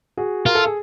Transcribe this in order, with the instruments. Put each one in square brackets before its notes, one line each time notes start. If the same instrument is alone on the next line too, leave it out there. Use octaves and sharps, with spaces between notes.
[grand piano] F#4 G#4
[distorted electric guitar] F4 [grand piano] A#4
[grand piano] A4
G#4